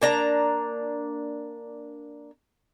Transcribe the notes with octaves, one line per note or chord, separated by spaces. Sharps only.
A#3 D4 A#5